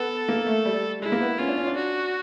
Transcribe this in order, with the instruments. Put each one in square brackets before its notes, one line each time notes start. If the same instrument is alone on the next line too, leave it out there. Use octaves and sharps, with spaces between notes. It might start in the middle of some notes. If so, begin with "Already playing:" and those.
Already playing: [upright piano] B3 [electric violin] A4
[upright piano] A#3
A3
G3
[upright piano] G#3 [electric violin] E4
[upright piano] A#3
B3
[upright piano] C#4 [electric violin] F4
[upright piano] D4
C#4
D4
[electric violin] F#4